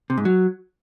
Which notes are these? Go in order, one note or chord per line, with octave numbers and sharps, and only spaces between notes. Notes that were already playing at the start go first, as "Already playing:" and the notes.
C3
G#2
F#3